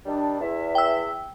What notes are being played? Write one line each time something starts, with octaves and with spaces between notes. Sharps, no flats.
D#3 G3 D4
E2 E5
G5 E6